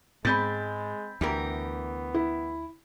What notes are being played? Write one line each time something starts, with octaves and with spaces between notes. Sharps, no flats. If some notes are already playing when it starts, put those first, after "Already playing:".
G#2 G#3 C4 B5 G6 A6
D2 E3 B3 G4 A#4
E4